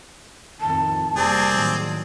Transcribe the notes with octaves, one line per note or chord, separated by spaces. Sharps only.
F2 A2 D#3 A5
F1 G3 A#3 C4 G#4 D5
A2 D#3 F#3